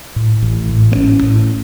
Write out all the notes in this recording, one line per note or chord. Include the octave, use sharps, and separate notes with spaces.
A2
A1
A2
A#3
A1 C#4
A2